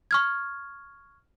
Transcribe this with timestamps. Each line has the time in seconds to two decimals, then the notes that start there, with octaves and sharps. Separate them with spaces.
0.11 C#6 F6 G#6